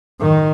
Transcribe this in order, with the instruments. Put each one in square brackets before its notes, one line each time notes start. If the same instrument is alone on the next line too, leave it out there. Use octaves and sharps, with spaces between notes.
[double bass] D#3